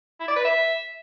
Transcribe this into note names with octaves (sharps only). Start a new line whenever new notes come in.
E4
D5
B4
E5